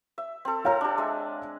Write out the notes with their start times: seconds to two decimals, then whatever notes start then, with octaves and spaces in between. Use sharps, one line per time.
0.18 E5
0.45 C4 A4
0.65 A4 C#5 F5 G5 F6
0.81 D4 G4
0.98 G#3 E5